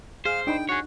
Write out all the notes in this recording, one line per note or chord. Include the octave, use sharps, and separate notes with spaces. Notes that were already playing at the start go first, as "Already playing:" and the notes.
G#4 C5 F5
D4 D#4 G5 B5
F#4 G#4 C#5